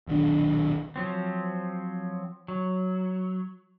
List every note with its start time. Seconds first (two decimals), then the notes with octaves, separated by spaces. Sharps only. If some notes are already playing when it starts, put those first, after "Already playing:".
0.08 D#1 B1 D#3 D4
0.96 F3 F#3 C4
2.48 F#3